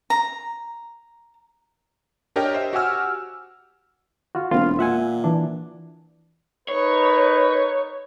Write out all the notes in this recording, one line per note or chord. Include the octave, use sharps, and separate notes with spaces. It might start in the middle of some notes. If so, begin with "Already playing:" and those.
A#5
D4 G4 A#4 C#5 D#5 G5
C5 D#5 E5
F#4 G4 F#5 G#5 E6 F6
F4 F#4
E1 A#3 C4 F4
A#2 E5 F#5 G#5
E3 D4
D#4 A#4 B4 C#5